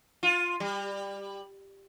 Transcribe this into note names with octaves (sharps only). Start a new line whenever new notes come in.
F4
G3